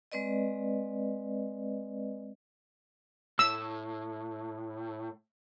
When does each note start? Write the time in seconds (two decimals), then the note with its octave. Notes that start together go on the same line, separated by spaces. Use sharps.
0.12 G#3 C4 B4 D5 D#5
3.39 A2 E6